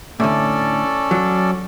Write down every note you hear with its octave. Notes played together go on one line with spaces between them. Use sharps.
A2 D3 C#4 A4 D5
F#3